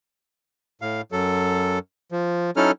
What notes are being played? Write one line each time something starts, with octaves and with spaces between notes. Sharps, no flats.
A2 F5
F#2 F#3 A4
F3
F#3 C#4 D#4 E4 A4 F6